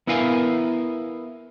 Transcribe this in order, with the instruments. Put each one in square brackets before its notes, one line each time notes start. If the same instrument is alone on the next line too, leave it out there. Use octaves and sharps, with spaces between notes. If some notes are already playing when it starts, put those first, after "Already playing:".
[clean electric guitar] B3 E4 A#4 F5 G#5